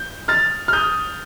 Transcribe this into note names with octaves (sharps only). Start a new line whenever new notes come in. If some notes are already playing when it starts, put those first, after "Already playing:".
Already playing: G6
F6 A6
F6
D#6 G6